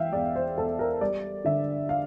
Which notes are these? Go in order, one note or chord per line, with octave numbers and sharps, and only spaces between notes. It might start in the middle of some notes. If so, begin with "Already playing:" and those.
Already playing: E3 E5 F5 G5
E2 D5
C5
E2 A4
A#4
G3 D5
D3 E5
F5